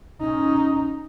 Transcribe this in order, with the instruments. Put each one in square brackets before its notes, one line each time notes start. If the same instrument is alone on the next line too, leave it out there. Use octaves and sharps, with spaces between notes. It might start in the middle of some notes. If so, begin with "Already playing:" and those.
[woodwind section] C#4 [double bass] D#4